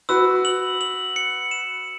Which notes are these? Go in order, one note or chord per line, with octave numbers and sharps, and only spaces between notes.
F#4 B4 E6
F#7
F#7
C#7
E7